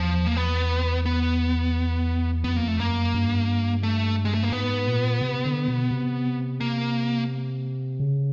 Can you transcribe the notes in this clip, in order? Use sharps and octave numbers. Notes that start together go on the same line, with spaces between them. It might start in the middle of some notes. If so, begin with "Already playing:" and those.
Already playing: E2 F3
A#3
B3
B3
F2 B3
A#3
A3
F#2 A#3
G2
A3
G#3
A3
A#3
G#2 B3
A#2
C3
D3
B2
C3
A#3
C#3